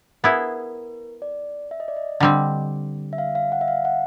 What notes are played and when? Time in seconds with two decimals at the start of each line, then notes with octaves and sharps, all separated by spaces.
0.24 B3 E4 G#4 A#4
1.22 D5
1.71 E5
1.80 D#5
1.88 D5
1.97 D#5
2.20 D3 G3 C4
3.13 E5
3.18 F5
3.35 F5
3.52 F#5
3.61 E5
3.68 F5
3.85 F#5